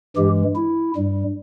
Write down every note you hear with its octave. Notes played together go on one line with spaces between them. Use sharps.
G2 E3 G#3 G4
E4
G2 G3